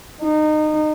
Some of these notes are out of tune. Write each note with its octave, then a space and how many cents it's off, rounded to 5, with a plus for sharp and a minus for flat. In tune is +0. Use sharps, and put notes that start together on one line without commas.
D#4 -25